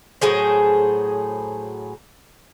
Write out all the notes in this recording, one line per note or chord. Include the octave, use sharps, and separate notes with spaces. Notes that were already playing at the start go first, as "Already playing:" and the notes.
A2 F#3 G#4 C5